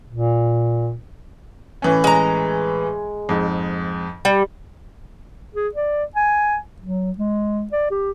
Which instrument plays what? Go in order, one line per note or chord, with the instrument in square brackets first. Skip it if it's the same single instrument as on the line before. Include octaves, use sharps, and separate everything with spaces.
[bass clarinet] A#2
[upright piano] A2 E3 C#4
[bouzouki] G#3 A#5
[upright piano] F2 G#2
[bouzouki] G3
[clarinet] G#4
D5
G#5
F#3
G#3
D5
G4